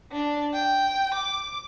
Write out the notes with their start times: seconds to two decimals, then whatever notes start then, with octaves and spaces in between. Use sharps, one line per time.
0.12 D4
0.54 G5
1.15 D6